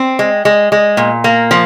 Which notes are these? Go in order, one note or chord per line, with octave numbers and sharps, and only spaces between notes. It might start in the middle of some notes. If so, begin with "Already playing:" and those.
Already playing: C4
G#3
G#3
G#3
A#2
A#3
F3